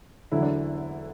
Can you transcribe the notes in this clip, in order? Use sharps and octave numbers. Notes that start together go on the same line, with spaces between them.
E1 D2 D3 F#3 E4
D4